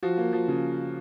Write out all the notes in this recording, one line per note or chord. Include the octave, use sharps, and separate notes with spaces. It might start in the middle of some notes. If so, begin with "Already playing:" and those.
F3 F#4
A#3
F3
C#3